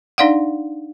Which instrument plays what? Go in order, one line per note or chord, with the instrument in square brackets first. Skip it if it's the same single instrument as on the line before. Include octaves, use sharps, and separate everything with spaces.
[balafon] D4 D#4 D5 F5 F#5